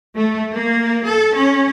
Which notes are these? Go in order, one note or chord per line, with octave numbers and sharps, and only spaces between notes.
A3
A#3
A4
C#4